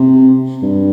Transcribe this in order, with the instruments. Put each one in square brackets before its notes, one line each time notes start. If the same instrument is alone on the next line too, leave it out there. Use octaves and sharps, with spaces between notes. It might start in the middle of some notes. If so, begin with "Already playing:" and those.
Already playing: [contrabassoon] C3
G2